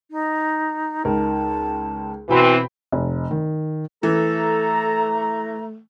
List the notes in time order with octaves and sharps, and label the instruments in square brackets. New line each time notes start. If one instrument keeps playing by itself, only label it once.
[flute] D#4
[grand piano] C#2 D#4 A#4 [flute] A5
[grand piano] B2 G5 B5 [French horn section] E3 C4 [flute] F#4
[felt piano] F1
D#3
[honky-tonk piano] E3 [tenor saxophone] A3 [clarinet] A4 [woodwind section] A#5